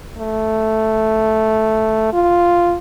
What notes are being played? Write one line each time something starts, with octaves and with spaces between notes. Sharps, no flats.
A3
F4